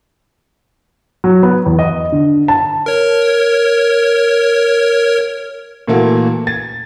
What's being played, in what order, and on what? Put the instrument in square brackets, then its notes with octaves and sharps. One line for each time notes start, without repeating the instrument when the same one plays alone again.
[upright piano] F#3
B3
E2
D#5
D3
A5
[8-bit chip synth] A#4 C#5
[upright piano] A#2 E3 A3 A#3 F#4
G#6 A6